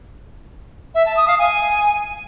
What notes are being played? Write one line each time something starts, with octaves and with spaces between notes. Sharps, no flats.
E5
A5
D#6
F5
G#5